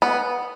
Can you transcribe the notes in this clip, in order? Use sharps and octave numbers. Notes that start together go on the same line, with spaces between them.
B3